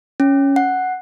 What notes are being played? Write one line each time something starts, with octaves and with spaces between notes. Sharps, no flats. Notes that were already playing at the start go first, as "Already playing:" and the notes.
C#4
F#5